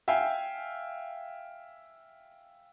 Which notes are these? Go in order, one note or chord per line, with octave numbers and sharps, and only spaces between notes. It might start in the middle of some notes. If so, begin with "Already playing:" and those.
E5 F5 G5 G#5